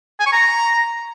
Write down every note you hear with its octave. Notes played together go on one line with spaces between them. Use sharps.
G#5
C#6
A#5